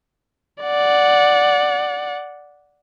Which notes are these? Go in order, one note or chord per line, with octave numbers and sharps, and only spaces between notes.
D5 F#5